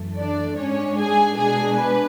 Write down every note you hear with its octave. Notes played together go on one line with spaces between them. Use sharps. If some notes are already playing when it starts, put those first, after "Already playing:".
Already playing: F#2 E3 A3
D4 D5
G#2 G#3 C#4 D4 C#5
G#4 G#5
B2 G#3 D4 G#4 G#5
B4